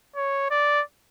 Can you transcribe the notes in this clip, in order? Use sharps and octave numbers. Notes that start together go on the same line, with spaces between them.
C#5
D5